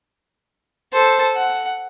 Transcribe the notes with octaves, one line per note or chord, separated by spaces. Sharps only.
A4 C5
F#5